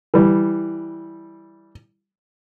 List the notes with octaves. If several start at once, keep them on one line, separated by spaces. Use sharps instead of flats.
E3 G3